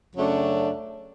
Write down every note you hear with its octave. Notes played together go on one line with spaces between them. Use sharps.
F#2 C#3 F#3 A3 D4